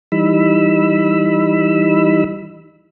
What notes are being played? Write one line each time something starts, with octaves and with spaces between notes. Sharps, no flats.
E3 G3 D#4 B5 E6